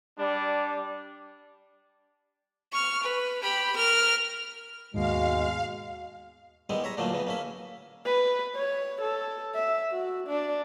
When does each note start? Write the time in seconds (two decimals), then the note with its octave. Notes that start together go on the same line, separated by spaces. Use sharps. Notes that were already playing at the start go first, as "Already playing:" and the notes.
0.18 G3 D4
2.72 C#6 F6
3.03 B4
3.43 G4 B5
3.76 A#4 F6
4.94 D#2 G#2 B2 G#3 F5
6.69 D#3 G3 G#3 B3 E4
6.84 C#5 E5 A#5
6.97 A#2 D3 E3 F#3 A3 A#3
7.12 C#3 E3 B3
7.27 A#3 C#4 E5
8.06 B4
8.55 C#5
9.01 A4
9.55 E5
9.91 F#4
10.27 D4